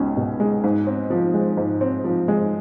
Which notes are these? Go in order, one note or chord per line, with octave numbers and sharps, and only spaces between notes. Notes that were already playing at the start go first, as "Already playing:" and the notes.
Already playing: C#2 B2 G#3 C#4
B2
G#3
G#2
C4
F3
G#3
G#2
C4
F3
G#3